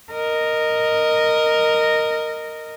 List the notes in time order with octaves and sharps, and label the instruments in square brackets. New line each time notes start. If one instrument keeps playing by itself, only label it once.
[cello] A#4 D#5